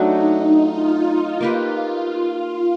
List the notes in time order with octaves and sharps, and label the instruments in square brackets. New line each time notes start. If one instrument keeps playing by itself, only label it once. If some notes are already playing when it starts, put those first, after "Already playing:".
Already playing: [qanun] F#3 A3 D4 F#4 [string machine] D#4
[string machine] F4
[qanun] A#3 D#4 G4 B4
[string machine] F4